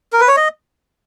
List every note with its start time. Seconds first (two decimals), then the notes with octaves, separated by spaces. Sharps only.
0.13 A#4
0.20 B4
0.28 C#5
0.37 D#5